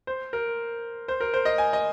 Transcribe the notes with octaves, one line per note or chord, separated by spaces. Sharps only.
C5
A#4
C5
A#4
C5
D#5
G#5
D#5